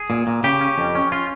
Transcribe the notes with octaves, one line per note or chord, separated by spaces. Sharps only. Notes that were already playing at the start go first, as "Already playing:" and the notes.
Already playing: G#4
A#2
A#2
C#3 G4
C#4
F2
C#4
C#4 F4